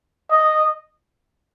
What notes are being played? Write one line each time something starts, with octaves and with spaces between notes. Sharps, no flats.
D#5